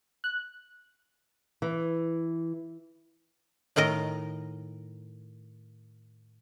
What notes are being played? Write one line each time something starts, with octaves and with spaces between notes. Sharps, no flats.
F#6
E3
A2 D#3 A#4 D#5